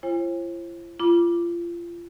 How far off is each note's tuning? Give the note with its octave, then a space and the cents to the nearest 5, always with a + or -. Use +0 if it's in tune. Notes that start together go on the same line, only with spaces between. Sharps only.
F4 -45 C5 +40 G#5 -40
F4 -30 B5 -40 D6 +0